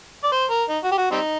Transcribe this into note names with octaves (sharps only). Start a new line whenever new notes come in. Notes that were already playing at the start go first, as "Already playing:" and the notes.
D5
C5
A#4
D#4
F#4
G4
F#4
G3 C4 D#4